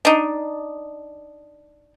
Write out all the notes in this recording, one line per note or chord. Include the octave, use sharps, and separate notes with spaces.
D4 D#4